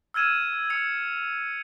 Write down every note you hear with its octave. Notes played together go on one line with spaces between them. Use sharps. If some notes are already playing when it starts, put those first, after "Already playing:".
E6 F6 G#6 D#7 E7
E6 C#7 F7